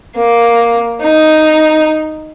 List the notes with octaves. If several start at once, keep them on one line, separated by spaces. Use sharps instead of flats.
A#3
D#4